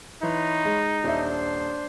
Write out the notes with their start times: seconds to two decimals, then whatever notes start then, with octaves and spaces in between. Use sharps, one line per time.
0.23 E3 D#4 C#5 B5 C6
0.65 G#3
1.04 D#1 D4 C5 E5 C6